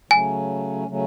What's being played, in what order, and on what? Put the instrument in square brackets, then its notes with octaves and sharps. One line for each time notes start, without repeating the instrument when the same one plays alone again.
[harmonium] C#3 F#3 A3 C#4 [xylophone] G#5
[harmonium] C#3 F#3 A3 C#4